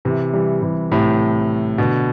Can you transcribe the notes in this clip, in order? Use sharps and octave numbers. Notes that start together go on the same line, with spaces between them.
C3 E3
E3 G3
C3 E3
A2 C3
B2 D3